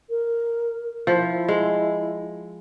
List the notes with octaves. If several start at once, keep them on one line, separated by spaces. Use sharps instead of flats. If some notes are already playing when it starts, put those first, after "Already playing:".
A#4
F3 E4
G#3